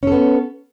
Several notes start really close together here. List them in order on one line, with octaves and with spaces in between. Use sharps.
C#4 A4 B3